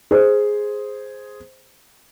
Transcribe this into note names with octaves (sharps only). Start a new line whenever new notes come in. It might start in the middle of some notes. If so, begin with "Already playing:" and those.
G#4 C5